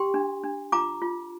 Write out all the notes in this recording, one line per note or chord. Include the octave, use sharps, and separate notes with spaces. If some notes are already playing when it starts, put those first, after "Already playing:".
Already playing: G4 G5 C6
D4
D4
F4 A#5 D6
F4